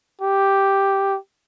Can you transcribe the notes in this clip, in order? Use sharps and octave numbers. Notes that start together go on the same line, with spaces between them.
G4